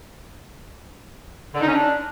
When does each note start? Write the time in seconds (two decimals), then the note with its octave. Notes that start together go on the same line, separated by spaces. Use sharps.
1.54 D3
1.61 D#4
1.67 C#4
1.73 D4